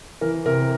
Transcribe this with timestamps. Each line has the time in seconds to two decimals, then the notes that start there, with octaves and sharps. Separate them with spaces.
0.21 E3 A#4
0.46 C3 A#4